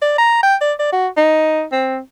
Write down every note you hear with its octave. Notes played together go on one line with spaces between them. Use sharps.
D5
A#5
G5
D5
D5
F#4
D#4
C4